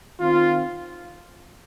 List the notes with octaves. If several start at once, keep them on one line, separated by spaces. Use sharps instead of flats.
D#3 C4 F4